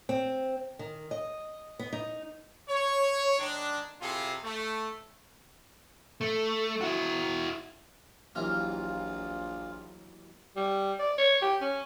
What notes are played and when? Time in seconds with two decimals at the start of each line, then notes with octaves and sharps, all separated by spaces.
0.09 C4
0.79 D#3
1.11 D#5
1.79 B3
1.93 D#4
2.69 C#5
3.39 D#3 G#3 D4
4.01 C3 E4 F4 G#4 A4
4.44 A3
6.21 A3
6.81 E4 F#4
8.35 A#1 D#2 E3 F#3 F4 F5 G5 F6
10.56 G3
10.99 D5
11.18 C#5
11.42 G4
11.61 C#4